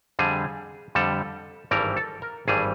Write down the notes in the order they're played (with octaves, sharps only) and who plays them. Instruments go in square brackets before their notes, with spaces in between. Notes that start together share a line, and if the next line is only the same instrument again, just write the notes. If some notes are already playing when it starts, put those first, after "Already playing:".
[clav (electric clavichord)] F2 D3 G3 G#4
F2 D3 G3 A4
G#1 G2 E3 G3 A#4
A4
A#4
G#1 G2 E3 G3 G#4